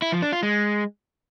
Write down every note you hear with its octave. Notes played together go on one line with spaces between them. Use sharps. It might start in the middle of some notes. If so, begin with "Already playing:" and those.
E4
F3
D4
F4
G#3